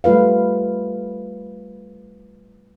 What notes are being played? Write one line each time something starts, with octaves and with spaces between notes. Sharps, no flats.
G3 A3 F4 B4 F5